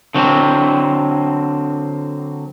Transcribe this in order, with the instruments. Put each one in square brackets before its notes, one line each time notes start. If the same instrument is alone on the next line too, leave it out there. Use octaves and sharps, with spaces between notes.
[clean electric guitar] D3 F#3 C4